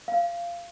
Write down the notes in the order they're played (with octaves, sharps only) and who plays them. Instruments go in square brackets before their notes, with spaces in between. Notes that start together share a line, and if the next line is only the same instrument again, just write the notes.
[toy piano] F5